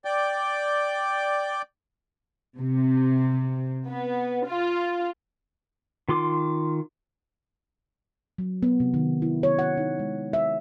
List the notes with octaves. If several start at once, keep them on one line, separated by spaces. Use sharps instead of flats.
D5 G5
C3
B3
F4
D#3 F4 C6 D6
F#3
B3
C3
D#3
E4
C#5
F#5
D#4
G#3
E5